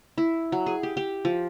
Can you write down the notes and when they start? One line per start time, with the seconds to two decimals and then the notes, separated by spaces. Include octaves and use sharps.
0.18 E4
0.52 F#3
0.66 G#4
0.83 G4
0.97 G4
1.25 F3